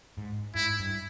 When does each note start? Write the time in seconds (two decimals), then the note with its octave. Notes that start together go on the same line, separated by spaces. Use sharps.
0.18 G#2
0.55 G#2 E4
0.80 G2